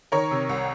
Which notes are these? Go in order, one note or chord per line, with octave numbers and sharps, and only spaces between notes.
D#3 A#4 C#5
C3
C2